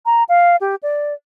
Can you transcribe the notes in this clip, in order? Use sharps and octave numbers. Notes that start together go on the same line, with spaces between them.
A#5
F5
G4
D5